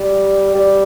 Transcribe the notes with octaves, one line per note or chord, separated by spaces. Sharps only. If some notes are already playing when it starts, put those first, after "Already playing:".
Already playing: G3
G3